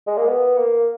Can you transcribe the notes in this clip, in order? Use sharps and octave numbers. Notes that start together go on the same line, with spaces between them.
G#3
A#3
B3
A#3